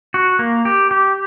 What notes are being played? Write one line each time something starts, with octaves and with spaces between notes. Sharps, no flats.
F#4
A#3
G4
G4